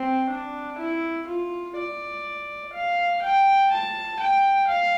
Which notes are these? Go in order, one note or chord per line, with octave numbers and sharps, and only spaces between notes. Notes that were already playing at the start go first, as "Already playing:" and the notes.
Already playing: C4
D4
E4
F4
D5
F5
G5
A5
G5
F5